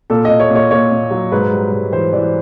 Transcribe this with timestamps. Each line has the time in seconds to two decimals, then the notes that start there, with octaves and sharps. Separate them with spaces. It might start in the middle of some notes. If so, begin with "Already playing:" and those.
0.10 A#2 A4
0.25 A#2 D#5
0.40 C#5
0.50 A#2
0.55 C#5
0.71 A#2 C#5
0.91 A#2
1.11 F#3
1.32 G#2 B4
1.51 G3
1.72 G#2
1.92 E3 C5
2.13 E3 D5